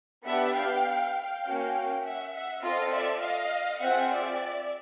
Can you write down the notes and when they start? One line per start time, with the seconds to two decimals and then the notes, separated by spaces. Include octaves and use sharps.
0.25 B3 D4 G4 E5 F#5
0.54 F5 G5
1.13 F5 G5
1.43 A#3 C#4 F#4
2.03 E5 F#5
2.33 E5 F#5
2.62 C4 F4 A4 D#5 F5
2.91 D5 E5
3.21 D#5 F5
3.80 C4 F4 G#4 E5 F#5
4.11 D5 E5